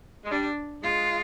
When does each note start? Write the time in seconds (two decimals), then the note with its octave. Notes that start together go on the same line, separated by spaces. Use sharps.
0.25 G#3
0.31 G3 D4
0.83 G#3 F4